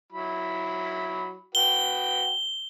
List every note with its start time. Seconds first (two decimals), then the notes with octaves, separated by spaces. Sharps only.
0.12 F#3 E4 B5
1.55 F#4 B4 G5 G7